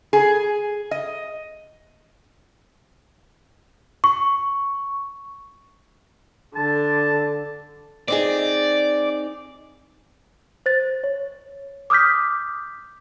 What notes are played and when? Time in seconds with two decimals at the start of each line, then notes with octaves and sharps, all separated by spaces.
0.13 G#4
0.91 D#5
4.04 C#6
6.55 D3 A5
8.08 C4 D#4 G#4 D5
10.66 C5 A6
11.04 C#5
11.90 D6 D#6 F6 G6 B6